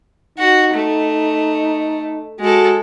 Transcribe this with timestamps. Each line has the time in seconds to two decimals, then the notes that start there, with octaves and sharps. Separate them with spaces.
0.38 D#4 F#4
0.74 A3
2.40 G#3 F#4 A4